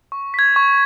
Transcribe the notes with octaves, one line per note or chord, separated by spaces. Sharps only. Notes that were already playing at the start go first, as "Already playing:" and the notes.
C#6
G#6 B6
C#6